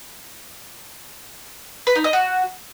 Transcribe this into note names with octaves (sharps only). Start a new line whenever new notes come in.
B4
D#4
D#5
F#4